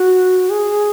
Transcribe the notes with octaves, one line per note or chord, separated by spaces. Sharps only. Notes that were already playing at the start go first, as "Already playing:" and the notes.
Already playing: F#4
G#4